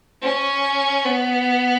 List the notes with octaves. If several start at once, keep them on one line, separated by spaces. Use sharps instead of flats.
C#4
B3